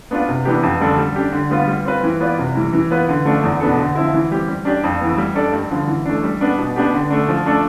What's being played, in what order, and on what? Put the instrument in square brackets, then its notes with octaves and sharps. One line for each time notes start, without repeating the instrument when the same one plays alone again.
[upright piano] B3 D4 F4
C3
E3 B3 D4 G4
F2
D3 G3 D4 A4
G3
D4 G4
D3
G3 B3 F4
G3
C4 F4 B4
E3
B3 F4 B4 D5
C3
E3 G3
E3
B3 F4 B4
D3
F3 A3 D4
E2
B2 B3 D4 A4
D3
F3 C4 E4
E3
G3 C4 G4
G3
D4 G4 D5
F2
E3 B3
G3
D4 A4 D5
G2
D3 F3
E3
A3 D4
G3
B3 D4
B2
B3 D4 G4
D3
A3 D4
F3
A3 D4 A4 D5